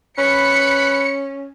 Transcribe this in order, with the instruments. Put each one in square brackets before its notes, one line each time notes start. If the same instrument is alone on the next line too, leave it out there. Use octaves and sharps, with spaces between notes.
[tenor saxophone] C#4 [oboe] B4 [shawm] B5 [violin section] C#7